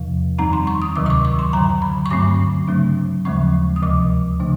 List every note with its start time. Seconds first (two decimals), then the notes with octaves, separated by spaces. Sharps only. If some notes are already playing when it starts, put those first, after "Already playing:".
Already playing: E2 C3 F3
0.38 F#2 D#3 G3 C4 D#4 A#5
0.53 C6
0.67 C#6
0.82 D#6
0.96 D2 C3 D#3 F#3 D6
1.06 D6
1.10 C#6
1.25 C#6
1.39 C6
1.53 F#2 D3 F#3 A#5
1.82 B5
2.06 C#6
2.11 G2 D3 F#3 A3 C4 D6
2.68 C#3 F#3 A3 D4
3.25 D#2 C#3 F3 G#3 C4 C#6
3.76 D#6
3.82 D2 C3 F3 D6
4.40 C#3 F3 A3 D4